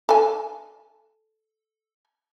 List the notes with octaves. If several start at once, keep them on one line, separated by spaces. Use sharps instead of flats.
A4 G#5